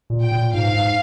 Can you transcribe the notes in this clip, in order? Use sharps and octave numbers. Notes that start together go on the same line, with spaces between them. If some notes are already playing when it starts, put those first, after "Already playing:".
A#2
G5
A#2
G#2 F5
G#2